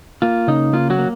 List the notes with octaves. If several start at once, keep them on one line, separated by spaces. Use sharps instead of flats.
A#3 F4
C#3 D#4
A#3 F4
F#3 F#4
A#3